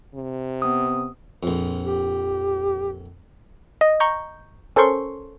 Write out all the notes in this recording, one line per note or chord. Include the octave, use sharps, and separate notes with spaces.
C3
B3 D#6
A#1 F2
G4
D#5
A#5 C#6 G6
C#4 A4 A#4 C5 C6 C#6